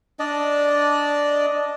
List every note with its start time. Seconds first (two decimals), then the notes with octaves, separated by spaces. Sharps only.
0.19 D4 D5 D#5